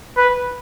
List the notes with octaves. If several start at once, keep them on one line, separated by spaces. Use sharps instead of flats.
B4